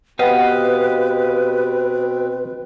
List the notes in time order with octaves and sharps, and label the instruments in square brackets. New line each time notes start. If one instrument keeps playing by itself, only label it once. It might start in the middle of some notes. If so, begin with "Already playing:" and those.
[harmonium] B2 C4 [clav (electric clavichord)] B3 G5 [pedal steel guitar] G4 D#5 F5 [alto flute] B4